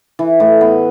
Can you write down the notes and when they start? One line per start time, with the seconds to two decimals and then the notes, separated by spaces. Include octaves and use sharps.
0.19 E3
0.40 A2
0.61 B3